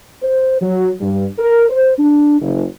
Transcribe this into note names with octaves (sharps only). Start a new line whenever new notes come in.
C5
F#3
G2
A#4
C5
D4
F#1